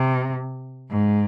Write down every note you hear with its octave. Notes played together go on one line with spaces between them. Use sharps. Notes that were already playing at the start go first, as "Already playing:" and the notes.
Already playing: C3
G#2